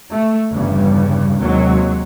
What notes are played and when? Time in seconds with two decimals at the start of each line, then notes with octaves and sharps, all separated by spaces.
0.11 A3
0.52 G1 E2 G2 C#3 G3
1.39 D#2 C3 F#3 G#3